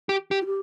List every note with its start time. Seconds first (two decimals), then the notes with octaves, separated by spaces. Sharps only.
0.09 G4
0.31 G4
0.41 F4
0.46 G4